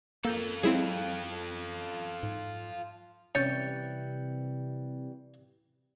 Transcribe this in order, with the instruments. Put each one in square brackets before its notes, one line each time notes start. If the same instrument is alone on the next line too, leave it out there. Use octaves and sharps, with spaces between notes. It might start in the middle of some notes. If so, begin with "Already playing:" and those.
[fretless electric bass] A#3 [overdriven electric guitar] F4 A4 [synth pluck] E6 G6
[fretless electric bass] F#3 G#3 [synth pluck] C4 E4 G#4
[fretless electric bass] G#2
[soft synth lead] C3 [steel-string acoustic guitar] E3 G3 [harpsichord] C#4 [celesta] G6 A6 C#7